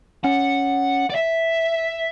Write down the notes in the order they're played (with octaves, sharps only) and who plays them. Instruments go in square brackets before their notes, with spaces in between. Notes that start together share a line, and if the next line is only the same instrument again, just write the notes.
[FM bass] C#4 [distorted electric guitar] F#5
[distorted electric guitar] D5
E5